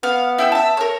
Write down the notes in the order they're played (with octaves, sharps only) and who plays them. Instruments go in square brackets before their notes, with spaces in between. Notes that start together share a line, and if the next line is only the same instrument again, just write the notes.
[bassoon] B3 [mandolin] F5
[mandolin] E4 G5 E6
E5 A5
A#4 C#5